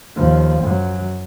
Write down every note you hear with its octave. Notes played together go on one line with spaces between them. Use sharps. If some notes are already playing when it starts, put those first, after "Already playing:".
D#2 F3
F#2 F#3